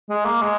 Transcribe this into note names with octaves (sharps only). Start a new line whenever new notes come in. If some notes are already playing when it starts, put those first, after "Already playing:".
G#3
A#3
G#3